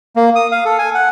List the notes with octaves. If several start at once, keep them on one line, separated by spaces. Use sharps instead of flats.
A#3
D#6
F5
A4
G#5
F#5